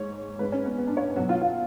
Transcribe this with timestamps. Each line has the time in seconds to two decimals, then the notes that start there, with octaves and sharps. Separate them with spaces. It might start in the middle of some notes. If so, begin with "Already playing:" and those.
Already playing: G#2 C#5
0.39 G#2 G#3 B4
0.52 C#4
0.65 B3
0.78 B3
0.87 D4
0.97 C#5
1.16 F#3 F#4
1.20 B2
1.29 F4
1.41 F4